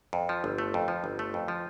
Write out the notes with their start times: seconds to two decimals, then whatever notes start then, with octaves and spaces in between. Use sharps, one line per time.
0.13 F2
0.29 F3
0.44 G1
0.58 A3
0.74 F2
0.88 F3
1.04 G1
1.19 A3
1.34 F2
1.48 F3